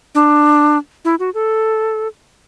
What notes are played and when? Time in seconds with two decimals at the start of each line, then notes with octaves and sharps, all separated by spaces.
0.15 D4
1.05 E4
1.19 F#4
1.34 A4